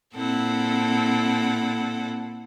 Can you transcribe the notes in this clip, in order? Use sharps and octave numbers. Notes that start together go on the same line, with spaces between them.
A#2 C4 E4 A4 F#5